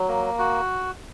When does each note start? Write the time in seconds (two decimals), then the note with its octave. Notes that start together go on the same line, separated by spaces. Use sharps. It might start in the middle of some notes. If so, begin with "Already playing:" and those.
Already playing: F#3
0.08 A#3
0.39 F#4